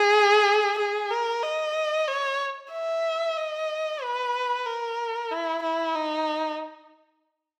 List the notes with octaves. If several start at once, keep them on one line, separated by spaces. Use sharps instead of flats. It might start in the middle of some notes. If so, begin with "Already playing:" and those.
Already playing: G#4
G#4
A#4
D#5
C#5
E5
D#5
B4
A#4
E4
E4
D#4